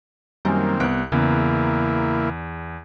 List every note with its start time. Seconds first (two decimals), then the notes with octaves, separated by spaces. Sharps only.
0.45 F#2 D#3 G3 A#3 C4 G#5
0.80 C2 B3 F#6 D7
1.12 E2 C#3 A#3 E4